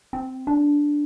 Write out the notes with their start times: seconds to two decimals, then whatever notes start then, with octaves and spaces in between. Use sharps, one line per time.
0.13 C4
0.47 D4